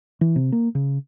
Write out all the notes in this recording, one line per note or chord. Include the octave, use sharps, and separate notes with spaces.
E3
C3
A#3
C#3